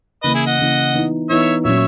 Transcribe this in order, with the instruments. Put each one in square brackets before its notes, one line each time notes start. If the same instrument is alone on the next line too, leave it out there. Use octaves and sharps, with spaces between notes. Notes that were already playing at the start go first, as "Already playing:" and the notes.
[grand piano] C#3 E3 A#3 [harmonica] B4 D#5
[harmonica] E4 G#4
D#5 F#5
[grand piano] C#3 E3 A#3
E3 B3 D#4
[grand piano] E3 B3 D#4 [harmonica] C#5 E5
[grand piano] A#2 F#3 C#4 [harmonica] C#5 E5